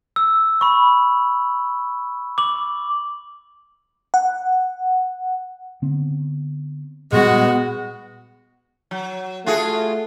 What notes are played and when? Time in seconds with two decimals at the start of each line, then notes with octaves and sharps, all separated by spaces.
0.16 E6
0.61 B5 C#6
2.38 D6 F#7
4.14 F#5
5.82 D3 B3 C4
7.12 A#2 G3 G#3 B3 F#4
8.91 F#3
9.46 A3 F4 F#4 G#4